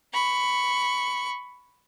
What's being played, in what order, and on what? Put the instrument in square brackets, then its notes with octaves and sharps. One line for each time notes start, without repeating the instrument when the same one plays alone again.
[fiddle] B5 C#6